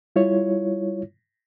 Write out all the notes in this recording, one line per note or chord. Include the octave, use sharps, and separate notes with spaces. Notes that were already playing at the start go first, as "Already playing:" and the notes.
G3 E4 F4 C#5